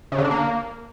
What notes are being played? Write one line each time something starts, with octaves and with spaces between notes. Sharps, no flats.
C#3
D3
D4
A#3